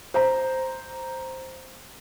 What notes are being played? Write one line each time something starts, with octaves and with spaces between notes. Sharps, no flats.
C5 A#5